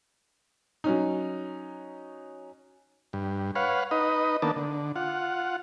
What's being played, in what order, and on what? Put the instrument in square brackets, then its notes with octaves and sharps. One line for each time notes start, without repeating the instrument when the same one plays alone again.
[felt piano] F#3 C#4 D#4
[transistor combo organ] G2
B4 C#5 F5 F#5
D#4 B4 D#5
D#3 A#3 B3 D4 A5
D3
F4 F#5